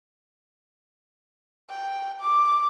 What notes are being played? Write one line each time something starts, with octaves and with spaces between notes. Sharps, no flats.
G5
D6